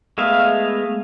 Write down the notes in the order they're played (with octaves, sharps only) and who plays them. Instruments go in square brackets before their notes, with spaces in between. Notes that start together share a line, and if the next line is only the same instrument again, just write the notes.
[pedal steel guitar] G#3 A3 B3 E5 F5